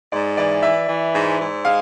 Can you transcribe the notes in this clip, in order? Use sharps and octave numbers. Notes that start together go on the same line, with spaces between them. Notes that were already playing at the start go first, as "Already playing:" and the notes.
G#2 D5
E3 D5
E3 E5
E3
G#2
G#2
G#3 F5